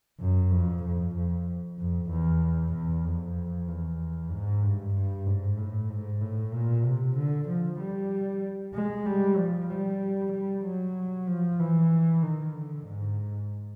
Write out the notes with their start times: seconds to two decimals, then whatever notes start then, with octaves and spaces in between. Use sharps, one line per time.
0.20 F#2
0.51 F2
0.83 F2
1.15 F2
1.78 F2
2.10 E2
2.73 E2
3.05 F2
3.68 E2
4.31 G#2
4.63 G2
4.94 G2
5.26 G#2
5.58 A2
5.89 G#2
6.21 A2
6.52 A#2
6.85 C3
7.16 D3
7.47 F3
7.80 G3
8.74 G#3
9.05 G3
9.38 F3
9.69 G3
10.32 G3
10.65 F#3
11.27 F3
11.59 E3
12.22 D#3
12.54 D3
12.86 G#2